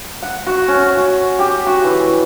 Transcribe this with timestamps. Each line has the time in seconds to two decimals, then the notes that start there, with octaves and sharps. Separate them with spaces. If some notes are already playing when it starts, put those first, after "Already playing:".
0.22 F#5
0.47 F#4
0.68 C#4
0.97 F#4
1.39 G4
1.67 F#4
1.84 E3